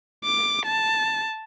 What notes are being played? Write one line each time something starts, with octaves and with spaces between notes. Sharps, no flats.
D6
A5